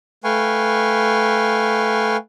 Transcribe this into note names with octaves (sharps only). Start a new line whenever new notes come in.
A3 B4 F5 G5 G#5 C#6